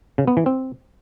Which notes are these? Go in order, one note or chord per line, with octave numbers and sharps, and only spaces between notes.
C#3
B3
E3
C4